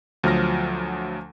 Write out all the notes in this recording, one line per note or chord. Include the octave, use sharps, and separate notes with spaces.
D2 F3 F#3 F6 A#6